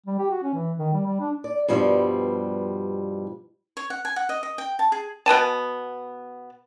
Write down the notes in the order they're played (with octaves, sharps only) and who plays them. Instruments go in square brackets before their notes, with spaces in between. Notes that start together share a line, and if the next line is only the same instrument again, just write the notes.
[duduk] G3
G4
F#4
C#4
E3
D#3
G3
G3
D4
[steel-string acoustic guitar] D5
G2 B2 F3 G3
[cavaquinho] C#5
F#5
G#5
F#5
D#5
D#5
G5
A5
G#4
[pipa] B2 B3 G#5 A5